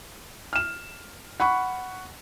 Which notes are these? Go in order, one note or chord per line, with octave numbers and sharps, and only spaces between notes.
F6 E7
F#5 B5 C#6